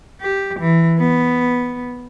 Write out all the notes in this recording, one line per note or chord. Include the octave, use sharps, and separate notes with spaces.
G4
E3
B3